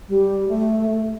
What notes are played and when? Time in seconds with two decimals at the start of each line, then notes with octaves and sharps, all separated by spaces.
0.08 G3
0.48 A3
0.89 A3